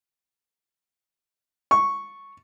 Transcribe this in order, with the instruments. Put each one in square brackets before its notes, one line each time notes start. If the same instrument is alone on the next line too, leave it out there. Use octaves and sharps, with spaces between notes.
[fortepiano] C#6